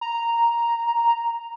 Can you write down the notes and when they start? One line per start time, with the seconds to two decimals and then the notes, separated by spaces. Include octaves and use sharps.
0.01 A#5